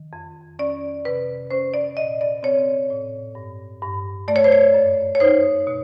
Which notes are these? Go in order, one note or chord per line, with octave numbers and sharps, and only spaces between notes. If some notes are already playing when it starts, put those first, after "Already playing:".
Already playing: D#3
F2
C#4 D5
C3 B4
C#4 C5
D5
A#2 D#5
D5
C4 C#5
A2
G2
G2
A3 D5
C#5
C5
C#5
F#2
C#5
D#4 C5
B2